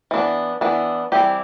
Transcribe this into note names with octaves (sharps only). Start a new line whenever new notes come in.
E3 B3 D4
E3 B3 D4
E3 G3 C4 E4 G4